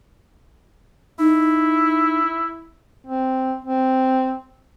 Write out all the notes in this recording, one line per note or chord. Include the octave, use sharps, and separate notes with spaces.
D#4 E4
C4
C4